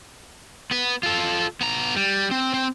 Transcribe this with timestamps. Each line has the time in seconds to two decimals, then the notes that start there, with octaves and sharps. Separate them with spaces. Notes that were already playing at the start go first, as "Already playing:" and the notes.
0.71 B3 B4
1.03 F4 A4
1.61 B3 A#5
1.96 G3
2.31 C4
2.54 C4